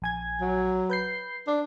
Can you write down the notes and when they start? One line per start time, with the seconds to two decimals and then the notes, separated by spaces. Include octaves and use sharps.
0.02 A#1 G#5 G#6
0.41 F#3
0.90 B4 G6 C7
1.47 D4